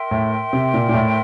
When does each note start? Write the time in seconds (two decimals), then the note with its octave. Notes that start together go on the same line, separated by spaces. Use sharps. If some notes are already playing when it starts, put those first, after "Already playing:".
Already playing: A#4 E5 G5 C6
0.11 A2
0.53 C3
0.74 A#2
0.89 A#2
0.94 A2